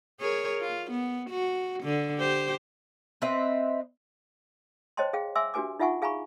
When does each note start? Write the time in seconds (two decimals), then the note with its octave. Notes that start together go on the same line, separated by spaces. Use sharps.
0.21 G#4 A#4 C#5
0.61 F4
0.91 B3
1.30 F#4
1.84 D3
2.18 G4 C5
3.22 C4 B4 D#5 E5
4.97 C5 C#5 D#5 G5 A5 C6
5.13 G#4 F5 G5
5.36 E5 G#5 C6 D6 E6
5.54 D4 F#4 G4 B4 G#5 D6
5.79 D#4 F4 E5 F#5 G#5 C#6
6.02 G#4 F5 G#5 A#5 B5 C#6